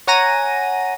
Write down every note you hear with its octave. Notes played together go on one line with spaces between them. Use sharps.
C#5 F#5 G#5 A#5 A#6 D#7